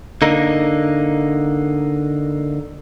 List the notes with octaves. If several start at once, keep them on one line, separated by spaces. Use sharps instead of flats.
D3 A#3 D#4